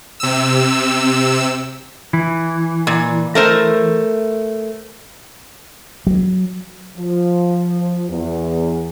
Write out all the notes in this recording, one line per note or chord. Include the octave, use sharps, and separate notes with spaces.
C3 E6
E3
A#2
A3 A#4 C5
F#3
F3
E2